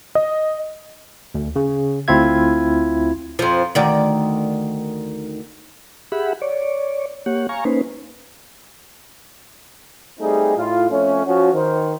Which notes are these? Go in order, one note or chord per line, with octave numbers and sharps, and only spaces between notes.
D#5
D2
C#3
D2 C4 E4 F4 E5 G#6
F2 F3
D2 D#3 D5
G4 G#4 E5 F#5 B5
C#5 D5
A#3 G4 C#5 F#5
F5 G#5 A#5 C#6
A#3 C#4 D#4 B4 C5
G3 A3 C4 D#4 G#4
A2 F4
F2 A3 C#4
F3 C#4 F#4
D#3 C5